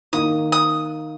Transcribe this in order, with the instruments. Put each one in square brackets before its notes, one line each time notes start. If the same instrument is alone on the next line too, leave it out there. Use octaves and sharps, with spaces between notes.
[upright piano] D#3 A#3 D#4 [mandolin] D#6
[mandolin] D#6